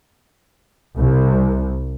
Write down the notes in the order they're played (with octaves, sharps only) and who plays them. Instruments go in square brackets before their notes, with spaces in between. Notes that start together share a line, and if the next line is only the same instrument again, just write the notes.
[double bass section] C2